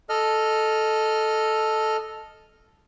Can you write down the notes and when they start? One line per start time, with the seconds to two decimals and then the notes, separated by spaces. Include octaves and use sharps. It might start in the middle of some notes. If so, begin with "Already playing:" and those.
0.09 A4 D#5 F6